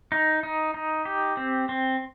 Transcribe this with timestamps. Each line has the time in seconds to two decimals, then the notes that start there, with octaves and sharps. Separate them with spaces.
0.12 D#4
0.43 D#4
0.74 D#4
1.05 G4
1.37 C4
1.69 C4